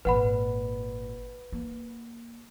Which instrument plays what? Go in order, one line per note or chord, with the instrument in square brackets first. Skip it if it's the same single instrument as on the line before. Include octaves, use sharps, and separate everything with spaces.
[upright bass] G#1 A#2 [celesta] B4 F#5 B5
[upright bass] A#3